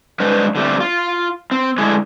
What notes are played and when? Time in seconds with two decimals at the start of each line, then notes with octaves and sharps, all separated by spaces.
0.20 G2 G#3 D4 B4 C5
0.55 D3 G3 A3 C4
0.80 F4
1.51 C4
1.78 D3 G#3 A3 E4 G#4